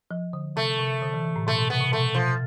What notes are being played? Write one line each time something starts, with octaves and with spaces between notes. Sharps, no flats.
F3
D3
C3 A3
C3
D3
E3
E3
A2
B2 A3
B2
C3 B3
C3
B2 A3
B2 F3